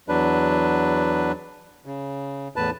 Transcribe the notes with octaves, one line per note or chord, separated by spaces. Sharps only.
E2 F#3 D4 B4
C#3
E2 A2 B4 A5